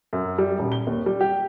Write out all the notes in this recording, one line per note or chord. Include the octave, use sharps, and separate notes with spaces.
F#2
G3
D#1
G7
D#2
G3
G4